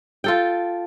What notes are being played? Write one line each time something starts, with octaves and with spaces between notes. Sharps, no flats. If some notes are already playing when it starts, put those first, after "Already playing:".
F4 A4 G5